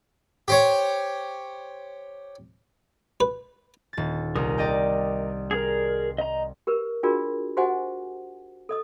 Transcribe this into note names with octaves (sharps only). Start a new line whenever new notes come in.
G4 C5 C#5
B4
D#1 A6
C2 A#4 D#6
D5 D#5 G5
G#4 A#4
D#5 A#5
G4 A#4 B4
D4 F4 F#4 G#4 A#4 D5
F#4 G4 C5 D#5 F#5 G#5
A4 D#5 D#6